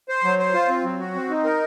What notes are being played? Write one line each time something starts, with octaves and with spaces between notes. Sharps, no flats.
C5
F#3
C5
F4
C4
F#3
F#4
C4
D#4
A#4